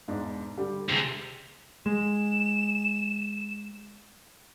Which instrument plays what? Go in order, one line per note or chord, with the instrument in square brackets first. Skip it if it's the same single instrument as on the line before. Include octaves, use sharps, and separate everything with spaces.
[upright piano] E1 G#2 D4
D3 G3 G4
[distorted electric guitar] D2 C3 [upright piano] G#4
[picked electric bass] G#3 [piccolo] E7